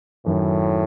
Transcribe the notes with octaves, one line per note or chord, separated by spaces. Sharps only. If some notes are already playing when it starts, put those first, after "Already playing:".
F#2 A2 D#3 F#3